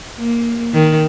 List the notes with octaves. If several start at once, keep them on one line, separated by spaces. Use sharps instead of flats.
A#3
D#3